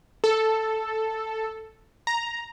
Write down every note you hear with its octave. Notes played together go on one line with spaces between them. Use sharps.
A4
A#5